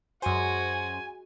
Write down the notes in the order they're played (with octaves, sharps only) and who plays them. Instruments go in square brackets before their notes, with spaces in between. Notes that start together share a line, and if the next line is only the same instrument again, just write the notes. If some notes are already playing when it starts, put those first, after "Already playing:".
[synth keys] F#2 C5 [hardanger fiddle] G#3 F#4 [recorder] G#5